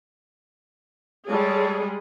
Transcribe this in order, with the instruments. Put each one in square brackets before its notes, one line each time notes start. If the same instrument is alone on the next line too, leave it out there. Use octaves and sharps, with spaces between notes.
[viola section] G3 G#3 G#4 [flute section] A4 C#5